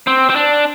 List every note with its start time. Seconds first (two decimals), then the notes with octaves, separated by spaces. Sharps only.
0.07 C4
0.30 C4
0.36 D4